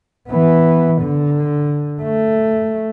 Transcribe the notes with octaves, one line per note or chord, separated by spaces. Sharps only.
E3 B3
D3
A3